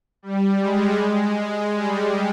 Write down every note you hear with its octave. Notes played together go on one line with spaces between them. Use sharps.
G3
G#3
G#3
G3